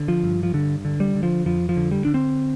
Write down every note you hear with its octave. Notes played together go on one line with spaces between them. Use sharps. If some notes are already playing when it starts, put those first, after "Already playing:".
Already playing: D3
F3
G2
F3
G2 D3
D3
G3
D3
F3
F2 F3
F3
D3
G3
D3 D4
C4